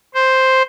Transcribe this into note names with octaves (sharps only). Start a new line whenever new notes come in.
C5